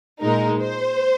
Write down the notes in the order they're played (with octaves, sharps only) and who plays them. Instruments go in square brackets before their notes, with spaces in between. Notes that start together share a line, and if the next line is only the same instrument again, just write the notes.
[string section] A#2 G#3 D#4 [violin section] A#4
[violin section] C5